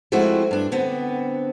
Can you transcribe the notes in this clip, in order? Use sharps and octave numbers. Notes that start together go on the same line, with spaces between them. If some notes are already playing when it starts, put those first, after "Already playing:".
F3 G#3 A3 C4 E4 F#4
G2 D4
D3 B3 C4